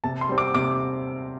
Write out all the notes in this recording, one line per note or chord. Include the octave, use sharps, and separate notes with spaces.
C3 A5
C6
G3 C4
D6
C3 D6